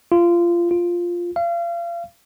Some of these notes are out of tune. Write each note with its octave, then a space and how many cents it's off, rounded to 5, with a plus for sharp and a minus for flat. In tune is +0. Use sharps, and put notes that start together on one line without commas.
F4 -20
F4 +0
F5 -35